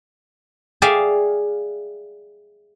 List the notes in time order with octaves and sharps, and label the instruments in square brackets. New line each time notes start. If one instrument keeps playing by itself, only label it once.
[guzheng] G#4 D5 E5 F5 G5 G#5